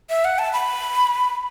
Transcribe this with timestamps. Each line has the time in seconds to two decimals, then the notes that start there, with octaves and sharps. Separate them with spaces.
0.10 E5
0.25 F#5
0.39 A5
0.53 B5